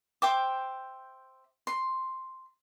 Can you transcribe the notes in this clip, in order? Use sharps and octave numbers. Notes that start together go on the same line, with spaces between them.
C5 E5 G5 D6
C6